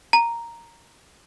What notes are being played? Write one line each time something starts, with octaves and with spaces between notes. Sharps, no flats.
A#5